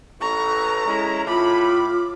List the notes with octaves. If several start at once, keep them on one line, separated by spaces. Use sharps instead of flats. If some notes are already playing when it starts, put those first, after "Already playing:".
A1 A4 B4 A#5 C#6
G#3 C#4 E4
A2 F4 B5 D6